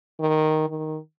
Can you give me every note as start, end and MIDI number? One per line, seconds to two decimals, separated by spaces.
0.20 0.64 51
0.69 0.98 51